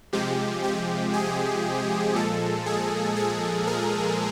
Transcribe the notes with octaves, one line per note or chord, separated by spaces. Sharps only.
C3 F3 G#3 G4
G4
G#4
A#2 F3 G#3 A4
G#4
G#4
A#4